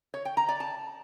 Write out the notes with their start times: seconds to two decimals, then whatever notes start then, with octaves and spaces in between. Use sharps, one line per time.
0.14 C#5
0.25 G5
0.37 A#5
0.49 D5
0.60 A5